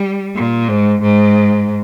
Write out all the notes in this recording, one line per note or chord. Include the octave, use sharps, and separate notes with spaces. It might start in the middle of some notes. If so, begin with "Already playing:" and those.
Already playing: G3
A#2
G#2
G#2